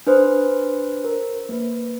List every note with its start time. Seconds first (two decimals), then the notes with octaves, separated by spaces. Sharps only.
0.07 D4 B4 C5
1.04 A#4
1.49 A#3 B4